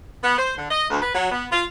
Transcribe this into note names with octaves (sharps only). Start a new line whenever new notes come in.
B3
C5
D3
D#5
D2
B4
F#3
B3
F4